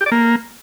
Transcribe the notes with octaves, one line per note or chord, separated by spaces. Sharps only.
G4
D5
A#3